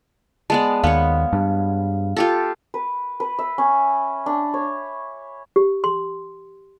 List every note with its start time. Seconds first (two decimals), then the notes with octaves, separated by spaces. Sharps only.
0.50 G#3 B3 D5 A5
0.84 D#2 B3 C#5 F5
1.33 G2
2.16 F4 G4 A4
2.74 B4
3.20 B4
3.39 E5
3.58 C#4
4.26 D4
4.54 C#5
5.56 G4
5.84 C6